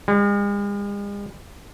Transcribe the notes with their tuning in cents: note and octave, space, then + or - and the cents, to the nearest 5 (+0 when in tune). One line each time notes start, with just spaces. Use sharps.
G#3 -45